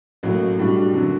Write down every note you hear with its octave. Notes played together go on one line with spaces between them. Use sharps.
A1 A2 F#3 A#3
A2 G3 D4 F#4
F#1 D3 F#3